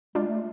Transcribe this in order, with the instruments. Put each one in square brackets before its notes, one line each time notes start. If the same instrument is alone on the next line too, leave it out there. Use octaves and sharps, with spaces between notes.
[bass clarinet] G#3 [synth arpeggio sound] D4 F4
[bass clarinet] A3